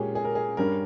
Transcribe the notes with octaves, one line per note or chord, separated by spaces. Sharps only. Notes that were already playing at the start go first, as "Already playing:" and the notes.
Already playing: A#2 G#3 C#4 G4 G#4
G#4
A#4
G#4
G2 G3 C#4 A#4